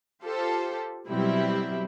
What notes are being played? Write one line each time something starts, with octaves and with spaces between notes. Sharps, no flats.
F4 G4 A4 C5
B2 F#3 G3 C4 E4